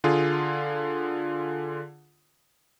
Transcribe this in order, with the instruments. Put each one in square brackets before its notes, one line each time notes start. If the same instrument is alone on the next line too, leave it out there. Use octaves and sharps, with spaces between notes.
[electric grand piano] D3 F4 G#4